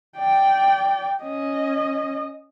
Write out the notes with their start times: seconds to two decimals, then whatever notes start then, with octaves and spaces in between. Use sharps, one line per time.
0.17 D5 G5
1.23 C#4 D#5